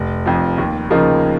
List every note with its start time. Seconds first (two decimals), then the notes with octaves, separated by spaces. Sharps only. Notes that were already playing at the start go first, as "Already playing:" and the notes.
Already playing: F1
0.26 F2 F3
0.58 D#2
0.90 C#3 F3 A#3 D#4